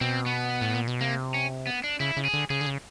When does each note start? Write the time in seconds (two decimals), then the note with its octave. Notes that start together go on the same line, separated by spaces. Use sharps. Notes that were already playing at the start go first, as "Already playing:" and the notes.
0.01 B2 C4
0.26 B3
0.61 A2
0.75 A#2
0.88 B2
1.01 C3 A#3
1.34 C#4
1.67 B3
1.84 D4
2.00 C#3 E4
2.17 C#3
2.25 G#4
2.33 D3
2.50 C#3 G#4
2.61 D3
2.66 C#3